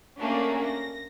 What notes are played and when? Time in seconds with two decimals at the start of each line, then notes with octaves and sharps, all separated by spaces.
0.19 A3 A#3 C#4 D4 F#4 G#4
0.64 A#6